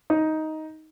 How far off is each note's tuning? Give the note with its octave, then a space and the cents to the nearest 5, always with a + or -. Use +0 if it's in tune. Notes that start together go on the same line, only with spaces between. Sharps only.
D#4 +10